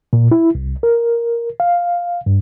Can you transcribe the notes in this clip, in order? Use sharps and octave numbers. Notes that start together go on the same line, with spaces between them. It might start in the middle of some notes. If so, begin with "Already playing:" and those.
A#2
E4
C2
A#4
F5
G2